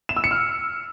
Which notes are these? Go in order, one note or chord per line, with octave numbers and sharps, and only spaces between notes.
E7
E6
C#7
F6